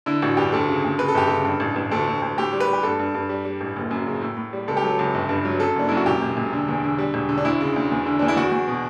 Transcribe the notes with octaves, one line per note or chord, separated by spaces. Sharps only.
D3 E4
A1 F#4
G2 G4
D2 A4
C#3
D2
C#3 B4
A4
G1 G4
C#3 A4
G2
A1
A1
D2 A4
D2
D2
A2 G4
G3
B4
G3 G4
G2 A4
G2
G2
G3
G3
A1
F#1
F#2
C#3
A2
A2
G3
C#2 A4
G4
F#3 A4
C#2
G1
G2
F#3
F#2 A4
F#1 D4
F#2 E4
F#4
E1 G4
E1
E1
D3
E2
D3
G3
E1
D3
D4
D2 E4
C#3
D2
E2
D3
E2 D4
E4
E2 F#4
E2
B2